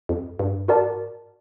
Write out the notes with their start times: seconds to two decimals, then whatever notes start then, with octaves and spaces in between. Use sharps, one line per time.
0.09 F2
0.39 G2
0.68 G#2 F#4 A#4 D5 F#5 A5